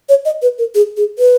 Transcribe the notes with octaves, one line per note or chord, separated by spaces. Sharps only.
C#5
D#5
B4
A#4
G#4
G#4
B4